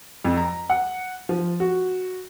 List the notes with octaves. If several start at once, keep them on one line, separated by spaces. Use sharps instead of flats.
F2
A#5
F#5
F3
F#4